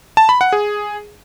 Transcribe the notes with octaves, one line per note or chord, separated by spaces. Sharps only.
A5
B5
F#5
G#4